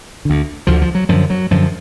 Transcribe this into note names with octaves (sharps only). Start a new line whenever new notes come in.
D2 D3
D2 D3 F3
F3
F#3
F#2 D3 F3
F#3
F#2 D3 F3